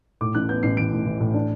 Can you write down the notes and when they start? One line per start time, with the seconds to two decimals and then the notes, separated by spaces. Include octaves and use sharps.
0.21 A2 D6
0.35 A1 F#6
0.49 B3 G6
0.63 A1 C7
0.77 E3 D7
0.92 A2
1.06 E3
1.20 A2
1.34 D4